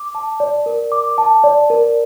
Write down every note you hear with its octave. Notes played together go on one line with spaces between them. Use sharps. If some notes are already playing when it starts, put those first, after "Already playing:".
Already playing: D6
A5
D5
A#4
D6
A5
D5
A#4